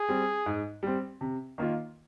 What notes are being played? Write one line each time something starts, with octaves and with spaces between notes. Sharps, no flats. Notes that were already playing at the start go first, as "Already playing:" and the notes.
Already playing: G#4
G3 C4
G#2
G3 C4
C3
D#3 A#3 F4